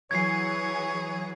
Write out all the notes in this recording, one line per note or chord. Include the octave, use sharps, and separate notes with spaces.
E3 F#3 G#4 C#5 G#6 C7